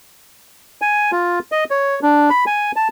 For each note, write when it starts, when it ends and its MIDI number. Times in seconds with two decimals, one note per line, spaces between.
0.82 1.11 80
1.12 1.39 65
1.52 1.64 75
1.71 2.00 73
2.03 2.30 62
2.30 2.45 83
2.47 2.72 80
2.76 2.88 81